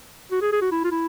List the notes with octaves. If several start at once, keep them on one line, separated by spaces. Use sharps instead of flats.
F#4
G#4
G#4
F#4
E4
F4
E4